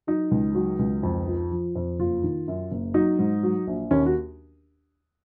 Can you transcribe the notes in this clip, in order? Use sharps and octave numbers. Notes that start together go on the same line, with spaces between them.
F#3 D#4
C#2
F#3
C#2
F2
F3
F3
F2
F#1 F4
D#3
F#2
F#1
F#3 D#4
G#2
F#3
A#1
D#2 C#4
F#4